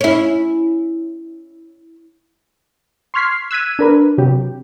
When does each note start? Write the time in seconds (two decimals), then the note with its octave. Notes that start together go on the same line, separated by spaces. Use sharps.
0.01 C#4 E4
3.14 C6 C#6 F6 G#6 B6 C7
3.51 E6 F#6 G#6 B6 D#7
3.79 D4 A#4 B4
4.18 C3 F#3 G4